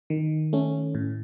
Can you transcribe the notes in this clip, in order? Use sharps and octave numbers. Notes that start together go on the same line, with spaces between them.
D#3
A3 C#4
A2